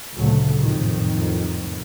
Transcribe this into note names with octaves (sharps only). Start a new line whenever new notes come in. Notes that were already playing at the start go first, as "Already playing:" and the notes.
D2 A#2 C#3 F#3 A3
F#1 C2 F2 A2 D#3